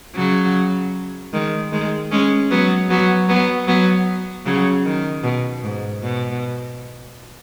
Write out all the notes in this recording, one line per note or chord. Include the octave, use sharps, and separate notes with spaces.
C#3 F#3
D#3 G#3
D#3 G#3
G#3 C#4
F#3 B3
F#3 B3
F#3 B3
F#3 B3
C#3 F#3
D#3
B2
G#2
B2